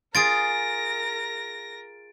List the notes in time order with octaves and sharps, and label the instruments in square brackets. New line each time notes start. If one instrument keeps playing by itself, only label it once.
[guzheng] F4 G#4 [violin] A#4 A#6 [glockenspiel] A6 D7